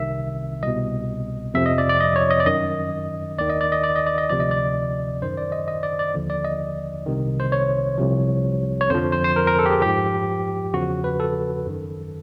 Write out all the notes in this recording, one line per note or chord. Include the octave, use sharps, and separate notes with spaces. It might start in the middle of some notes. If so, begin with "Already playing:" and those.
Already playing: C2 C3 D#3 E5
C2 B2 D#5
F2 C3 F3 E5
D#5
D5
D5
D#5
C#5
D#5
D5
F#2 D#3 D#5
D#2 D#3 D5
D#5
D5
D#5
D5
D#5
D5
D#5
D2 C3 F3 D5
D#5
D5
F#2 D#3 C5
D5
D#5
D#5
D5
D5
D#2 D3 F3
D5
D#5
C2 C3 D#3
C5
C#5
C2 C3 F3
C#5
F2 D3 F3 C5
C5
C5
A#4
A#4
A4
G4
G#4
G#2 F3 G4
E2 C#3 F3 F#4
B4
A4
F#2 D#3